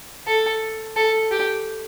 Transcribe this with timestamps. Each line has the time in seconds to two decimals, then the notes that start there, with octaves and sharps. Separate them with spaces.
0.27 A4
0.96 A4
1.31 G4